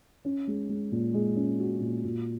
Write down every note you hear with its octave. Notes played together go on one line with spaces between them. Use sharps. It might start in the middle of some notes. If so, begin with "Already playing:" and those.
C#4
G#3
G#3
A#2
G#3
C#4
F#4
A#2
A#2